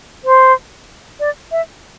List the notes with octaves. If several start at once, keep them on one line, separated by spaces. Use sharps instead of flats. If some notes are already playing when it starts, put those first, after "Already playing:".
C5
D5
E5